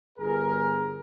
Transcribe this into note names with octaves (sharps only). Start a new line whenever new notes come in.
G1 G#4 A#4